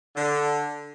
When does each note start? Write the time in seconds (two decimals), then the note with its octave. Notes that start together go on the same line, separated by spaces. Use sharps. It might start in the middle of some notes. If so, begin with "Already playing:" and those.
0.16 D3